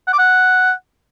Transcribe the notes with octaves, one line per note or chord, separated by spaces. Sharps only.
F#5
D6
F#5